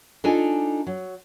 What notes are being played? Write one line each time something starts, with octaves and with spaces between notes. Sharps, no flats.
D4 D#4 F4 A4 D#5 G#5
F#3